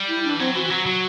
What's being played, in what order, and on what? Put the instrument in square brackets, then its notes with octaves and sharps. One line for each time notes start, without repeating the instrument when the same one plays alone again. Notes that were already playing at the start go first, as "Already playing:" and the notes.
Already playing: [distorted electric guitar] G3
[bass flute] E4
[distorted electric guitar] E3 [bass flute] D4
[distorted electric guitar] F#3 [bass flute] C4
[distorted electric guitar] E3 [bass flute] F#4
[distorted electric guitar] F#3 [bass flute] F#4
[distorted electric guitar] F#3